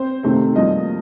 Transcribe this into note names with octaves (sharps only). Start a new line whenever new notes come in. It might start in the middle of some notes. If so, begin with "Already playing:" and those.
Already playing: C4 C5
C3 D#3 A3 C4
G2 F3 A#3 D#5